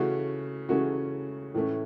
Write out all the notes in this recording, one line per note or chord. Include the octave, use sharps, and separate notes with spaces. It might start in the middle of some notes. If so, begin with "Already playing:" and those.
Already playing: C#3 E3 A3 C#4 F#4
C#3 E3 A3 C#4 F#4
A2 E3 A3 C#4